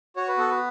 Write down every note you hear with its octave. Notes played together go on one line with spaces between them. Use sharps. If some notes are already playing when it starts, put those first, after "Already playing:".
F#4 C#5
B4
B3 A4
B4